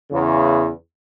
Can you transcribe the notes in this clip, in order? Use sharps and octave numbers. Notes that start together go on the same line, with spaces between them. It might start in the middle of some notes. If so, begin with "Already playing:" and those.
E2 C#3